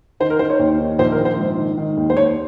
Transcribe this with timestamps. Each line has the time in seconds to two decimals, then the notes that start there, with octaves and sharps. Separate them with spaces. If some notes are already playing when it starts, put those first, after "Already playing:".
0.20 D#3 C5
0.30 A#4
0.39 D#3 C5
0.50 C#5
0.59 D#2
0.79 D#3
0.99 A#1 C5
1.12 A#4
1.19 A#1
1.25 C5
1.38 G#2
1.58 D#3
1.78 D#3
1.97 D#2
2.10 C5
2.17 D#2 C#5